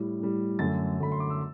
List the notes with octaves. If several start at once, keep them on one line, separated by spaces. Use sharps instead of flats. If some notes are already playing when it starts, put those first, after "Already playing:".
Already playing: A2 G3
A2 G3
F#2 D3 A3 A6
F#2 D3 A3 B5
C6
D6
E6